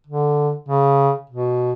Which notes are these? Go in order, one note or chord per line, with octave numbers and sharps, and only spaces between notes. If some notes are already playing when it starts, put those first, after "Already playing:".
D3
C#3
B2